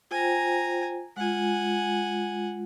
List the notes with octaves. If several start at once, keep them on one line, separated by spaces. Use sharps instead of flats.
F4 C5 G5 G#5 A#5
G#3 F4 F#5 G#5